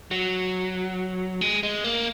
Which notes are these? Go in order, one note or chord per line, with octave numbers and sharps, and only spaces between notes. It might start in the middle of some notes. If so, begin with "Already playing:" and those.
F#3
G#3
G#3
A#3